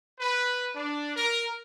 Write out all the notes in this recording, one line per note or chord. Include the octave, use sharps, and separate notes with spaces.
B4
D4
A#4